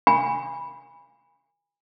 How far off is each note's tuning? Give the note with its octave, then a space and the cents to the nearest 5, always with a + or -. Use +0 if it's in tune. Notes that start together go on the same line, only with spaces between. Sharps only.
G#5 -30 B5 -10